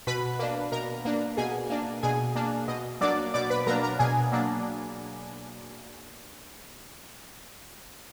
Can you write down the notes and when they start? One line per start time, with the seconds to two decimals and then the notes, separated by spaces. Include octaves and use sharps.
0.07 B2 B4 B5
0.39 A#3 D4
0.72 B2 A#4 A#5
1.05 A#3 D4
1.37 B2 G#4 G#5
1.70 A#3 D4
2.03 B2 G#4 G#5
2.35 A#3 D4
2.68 B2 D#5
3.01 F#3 A#3 D4 D5 D6
3.34 B2 D5 D6
3.50 B4 B5
3.67 F#3 A#3 D4 A#4 A#5
3.83 A#4 A#5
3.99 B2 G#4 G#5
4.32 F#3 A#3 D4